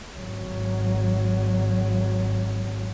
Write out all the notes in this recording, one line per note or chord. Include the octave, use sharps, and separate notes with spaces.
G#1 F#3